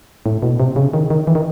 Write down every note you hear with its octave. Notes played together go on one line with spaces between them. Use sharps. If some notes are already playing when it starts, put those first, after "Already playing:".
A2
B2
C3
C#3
D#3
D#3
E3
D#3